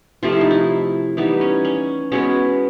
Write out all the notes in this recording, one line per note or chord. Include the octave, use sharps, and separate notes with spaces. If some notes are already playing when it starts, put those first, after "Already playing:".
C3 F3 A3 F4
E4
D#4
E4
E3 G3 B3 D#4
C#4
C#4
B2 G#3 B3 C#4